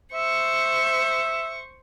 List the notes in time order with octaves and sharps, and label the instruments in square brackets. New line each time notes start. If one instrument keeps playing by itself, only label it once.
[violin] C5 C#6 [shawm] E5